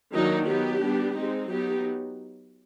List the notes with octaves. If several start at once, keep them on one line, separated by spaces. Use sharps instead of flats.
D#3 F#3 A#3 D4 D#4
F#3 B3 D#4 G4
G3 B3 D4
G#3 C4 D#4
F#3 B3 D#4 G4